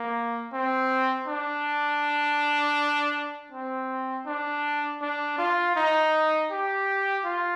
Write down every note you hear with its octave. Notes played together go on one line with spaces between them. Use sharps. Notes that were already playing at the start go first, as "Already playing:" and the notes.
Already playing: A#3
C4
D4
C4
D4
D4
F4
D#4
G4
F4